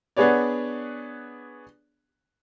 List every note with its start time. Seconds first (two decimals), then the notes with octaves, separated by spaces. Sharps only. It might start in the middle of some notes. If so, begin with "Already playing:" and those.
0.17 B3 D4 G#4 B4 C#5 D5